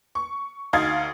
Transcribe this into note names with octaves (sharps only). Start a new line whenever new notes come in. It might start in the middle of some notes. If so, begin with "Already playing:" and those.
C#6
D2 D#4 F5 D#6 G#6 A6